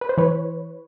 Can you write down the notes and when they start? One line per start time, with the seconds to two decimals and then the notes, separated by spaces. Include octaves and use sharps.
0.01 B4
0.09 C5
0.18 E3 B4 C#5